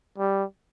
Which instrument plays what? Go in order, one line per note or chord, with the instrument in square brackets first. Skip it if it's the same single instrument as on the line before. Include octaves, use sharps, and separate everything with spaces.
[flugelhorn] G3